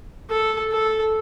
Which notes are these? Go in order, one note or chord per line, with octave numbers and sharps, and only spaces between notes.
A4
A4